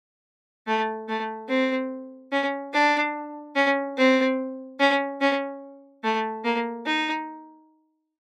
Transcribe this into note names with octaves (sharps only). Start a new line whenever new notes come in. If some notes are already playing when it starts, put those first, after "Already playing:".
A3
A3
C4
C#4
D4
C#4
C4
C#4
C#4
A3
A#3
D#4